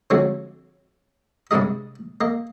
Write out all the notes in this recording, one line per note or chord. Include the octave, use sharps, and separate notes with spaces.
D3 F3 F#3 G#3 C4 C#4
G2 C3 G#3 D#4 G#4 D#5
A#3 D#5